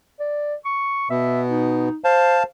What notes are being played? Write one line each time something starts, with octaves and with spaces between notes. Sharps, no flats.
D5
C#6
B2 B3 E5
D#4
C5 F5 A5